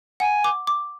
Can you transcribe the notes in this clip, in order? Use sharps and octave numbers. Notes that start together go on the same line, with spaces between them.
F#5 G#5
D6
D6